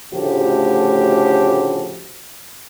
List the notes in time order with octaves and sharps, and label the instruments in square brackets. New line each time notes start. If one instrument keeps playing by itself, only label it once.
[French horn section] D2 A2 C#3 F3 F#4 G4